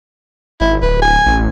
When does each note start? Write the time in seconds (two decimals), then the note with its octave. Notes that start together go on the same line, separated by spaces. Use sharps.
0.61 G#1 E4
0.82 D1 B4
1.02 G#5
1.26 A1